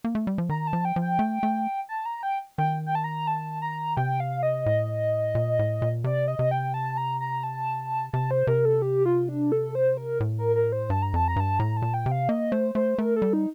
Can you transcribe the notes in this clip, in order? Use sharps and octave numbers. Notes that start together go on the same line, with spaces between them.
A#3
A3
G3
F3
D#3 A#5
A5
F3
G5
F3
G5
A3
A3
A5
A#5
G5
D#3 G5
G5
A5
A#5
A5
A#5
C3 G5
F5
D#5
A2
A#2
A2
A#2
C3 D5
D#5
C3
G5
A5
A#5
A#5
A5
C3 A5
C5
C3 A#4
A4
G4
F4
D4
A4
C5
A#4
A2
A#4
A#4
C5
G2 A5
A#5
F2 A5
A#5
G2 A5
A2 A#5
A5
A#2
G5
C3
F5
A#3 D#5
A3 C5
A3 C5
A3 A#4
A4
G3
D#4